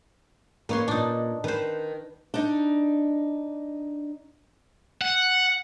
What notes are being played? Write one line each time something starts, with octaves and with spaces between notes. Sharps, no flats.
A#3 D#4 B4 C#5 C6
A#2 D4 D#4
D#3 B4 C5
D4 D#4
F#5